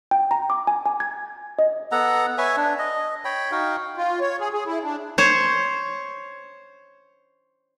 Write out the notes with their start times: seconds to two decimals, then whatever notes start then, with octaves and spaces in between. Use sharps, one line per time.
0.11 G5
0.31 A#5
0.50 D6
0.67 G#5
0.86 G#5
1.00 G#6
1.59 D#5
1.92 B3 A4 F#5 A#5
2.38 B4 C#5 E5 G#5
2.57 D4
2.79 D#5
3.25 C#5 G5 B5
3.52 D#4 F#4 F5 G5
3.97 F4
4.20 C#5
4.40 G#4
4.53 G#4
4.66 E4
4.84 D4
5.18 C5 C#5